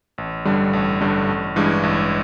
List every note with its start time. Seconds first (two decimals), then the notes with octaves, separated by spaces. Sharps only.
0.18 A1
0.45 G2 D3 G3
0.73 A1
1.01 G2 D3 G3
1.29 A1
1.56 G2 E3 G#3
1.83 A1